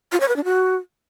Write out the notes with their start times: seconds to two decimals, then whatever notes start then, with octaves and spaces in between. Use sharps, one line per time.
0.12 F4
0.20 C#5
0.28 B4
0.36 D4
0.44 F#4